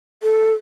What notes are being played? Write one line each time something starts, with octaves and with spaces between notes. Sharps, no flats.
A4